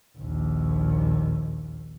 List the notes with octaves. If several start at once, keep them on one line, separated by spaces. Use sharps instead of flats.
A#1 D#2